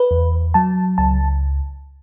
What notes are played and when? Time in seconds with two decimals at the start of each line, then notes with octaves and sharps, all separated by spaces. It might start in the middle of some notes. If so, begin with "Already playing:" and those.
Already playing: B4
0.11 E2
0.54 F#3 A5
0.98 C#2 A5